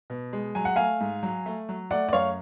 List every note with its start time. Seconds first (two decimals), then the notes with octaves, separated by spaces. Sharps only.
0.10 B2
0.33 G#3
0.55 F#3 G#5
0.65 F#5
0.76 A3 F5 G#5
1.00 G#2
1.23 F#3
1.46 A3
1.69 F#3
1.91 A3 D5 F#5
2.09 D5
2.13 F#2 C#5 F5